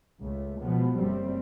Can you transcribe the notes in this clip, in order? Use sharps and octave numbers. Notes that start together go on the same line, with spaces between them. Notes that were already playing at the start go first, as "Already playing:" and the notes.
C#2 A3
B2 F3 G#3 B3
F#1 G3 A3 C4